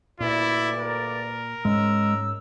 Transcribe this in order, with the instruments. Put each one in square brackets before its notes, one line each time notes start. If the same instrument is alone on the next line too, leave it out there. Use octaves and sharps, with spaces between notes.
[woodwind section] D2 G2 D5 [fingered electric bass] A#2 [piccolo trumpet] E4
[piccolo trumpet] A#4
[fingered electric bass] G#2 C#4 [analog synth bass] G#3 [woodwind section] E6